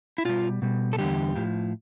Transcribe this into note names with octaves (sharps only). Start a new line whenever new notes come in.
E4
B2 G3 F4
B2 G3
A4
E2 D3 G3 G4
A2 F3